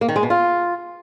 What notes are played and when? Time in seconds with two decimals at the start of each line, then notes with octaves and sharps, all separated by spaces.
0.01 A#3
0.08 D#3
0.16 G#3
0.23 B2
0.30 F4